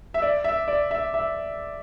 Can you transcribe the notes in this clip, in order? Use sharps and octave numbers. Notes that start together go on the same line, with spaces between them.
E5
D5
E5
D5
E5
E5